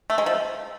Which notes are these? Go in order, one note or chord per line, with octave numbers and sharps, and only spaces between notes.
A3
G#3
F3